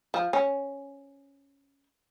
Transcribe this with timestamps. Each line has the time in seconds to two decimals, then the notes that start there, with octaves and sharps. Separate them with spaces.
0.14 F3
0.33 C#4